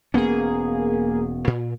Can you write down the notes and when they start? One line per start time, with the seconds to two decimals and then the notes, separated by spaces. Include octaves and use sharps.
0.14 E1 A#3 B3 C#4 G#4
1.47 A#2